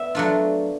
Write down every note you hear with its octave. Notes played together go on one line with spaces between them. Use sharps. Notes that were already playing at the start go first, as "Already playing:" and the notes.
Already playing: B3 E5
F#3 A3 D4 F4